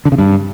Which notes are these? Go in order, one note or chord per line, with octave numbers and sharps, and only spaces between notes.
D3
C#3
G2